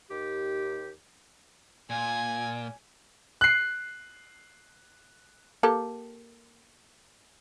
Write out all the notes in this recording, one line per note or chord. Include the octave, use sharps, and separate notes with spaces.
D#2 G4
A#2 G#5
F#6 C7
A#3 G4 A4